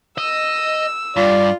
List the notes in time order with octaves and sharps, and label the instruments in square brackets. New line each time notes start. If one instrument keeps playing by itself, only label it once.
[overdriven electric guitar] D#5 [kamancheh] E6
[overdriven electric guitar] G2 [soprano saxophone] F4 [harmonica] D5